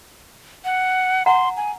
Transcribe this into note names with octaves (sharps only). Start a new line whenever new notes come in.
F#5
F#5 A#5 C6
G#5